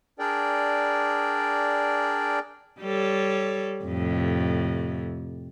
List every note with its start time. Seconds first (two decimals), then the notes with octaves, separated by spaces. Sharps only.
0.19 D4 G#4 A#4 D5 G5
2.80 G3 A4 C#5
3.84 F2 A2 C3